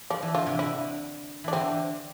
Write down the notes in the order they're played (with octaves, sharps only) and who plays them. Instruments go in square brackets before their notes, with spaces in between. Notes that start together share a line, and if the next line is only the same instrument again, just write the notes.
[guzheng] F3 [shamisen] D4
[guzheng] E3
[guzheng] D3 [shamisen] F4
[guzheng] C3
[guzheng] D3 [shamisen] E4
[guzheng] E3 [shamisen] D4
[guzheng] D3 [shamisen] C4